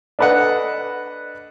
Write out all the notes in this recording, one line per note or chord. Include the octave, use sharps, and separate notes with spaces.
D4 A4 B4 D#5 F#5